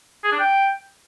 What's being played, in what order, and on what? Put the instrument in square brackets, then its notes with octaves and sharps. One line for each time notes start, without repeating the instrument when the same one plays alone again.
[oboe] G#4
D4
G5